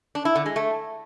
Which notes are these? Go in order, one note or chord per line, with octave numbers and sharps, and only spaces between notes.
D4
E4
D3
G#3
A3